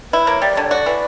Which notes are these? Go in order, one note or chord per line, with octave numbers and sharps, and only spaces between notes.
E4 B4
A#3 C#5
G3 D5
D3 C#5
F#4 D5
E3